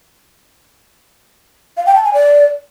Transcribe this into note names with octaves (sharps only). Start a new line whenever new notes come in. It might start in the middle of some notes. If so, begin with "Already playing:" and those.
F5
G5
A5
G#5
D5